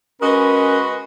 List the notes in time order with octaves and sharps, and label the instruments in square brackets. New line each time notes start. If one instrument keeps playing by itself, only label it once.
[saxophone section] G#3 F#4 D#5 [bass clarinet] C#4 [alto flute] A#4 [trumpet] B4